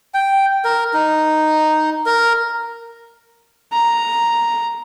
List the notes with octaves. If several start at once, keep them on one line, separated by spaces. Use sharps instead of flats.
G5
A#4
D#4
A#4
A#5